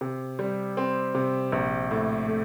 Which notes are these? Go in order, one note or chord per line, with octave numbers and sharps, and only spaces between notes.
C3
G3
C4
C3
A#1
A2
A3